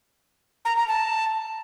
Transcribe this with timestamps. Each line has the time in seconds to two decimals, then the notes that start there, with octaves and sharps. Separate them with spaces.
0.65 A#5
0.77 A#5
0.88 A5